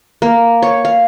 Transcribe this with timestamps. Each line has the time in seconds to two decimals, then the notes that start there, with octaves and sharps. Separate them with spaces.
0.22 A#3
0.62 C#5
0.85 F5